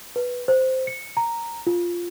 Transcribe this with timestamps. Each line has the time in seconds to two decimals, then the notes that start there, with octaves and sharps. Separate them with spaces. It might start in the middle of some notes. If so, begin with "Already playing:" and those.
0.16 B4
0.48 C5
0.87 C#7
1.17 A#5
1.67 F4